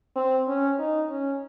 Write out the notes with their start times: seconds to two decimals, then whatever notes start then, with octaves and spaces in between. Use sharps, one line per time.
0.16 C4
0.48 C#4
0.79 D#4
1.09 C#4